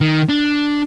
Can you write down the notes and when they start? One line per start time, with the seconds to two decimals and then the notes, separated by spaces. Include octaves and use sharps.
0.01 D#3
0.29 D4